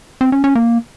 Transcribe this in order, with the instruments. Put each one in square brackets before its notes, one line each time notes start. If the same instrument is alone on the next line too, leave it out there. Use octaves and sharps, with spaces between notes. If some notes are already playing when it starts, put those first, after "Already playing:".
[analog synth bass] C4
C#4
C#4
A#3